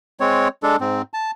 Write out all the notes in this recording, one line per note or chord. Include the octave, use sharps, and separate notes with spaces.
G#3 C4 C#5
G#3 D4 A4
G#2 C4
A5